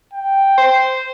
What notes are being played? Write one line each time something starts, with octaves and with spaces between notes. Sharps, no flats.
G5
C5